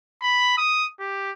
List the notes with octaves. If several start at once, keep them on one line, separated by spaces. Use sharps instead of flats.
B5
D#6
G4